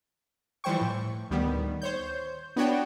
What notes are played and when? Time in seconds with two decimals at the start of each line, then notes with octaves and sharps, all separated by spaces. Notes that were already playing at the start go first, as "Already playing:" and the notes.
0.64 E3 F3 G3 C5 G5 C#6
0.81 A2
1.30 D2 D#3 G3 B3
1.81 C5 C#5 G6
2.56 B3 D4 F#4 C#5 G5